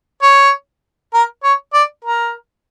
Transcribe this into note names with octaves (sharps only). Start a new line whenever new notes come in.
C#5
A#4
C#5
D5
A#4